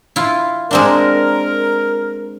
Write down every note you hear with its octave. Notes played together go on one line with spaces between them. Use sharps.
E4 F4
G#3 C4 D4 A#4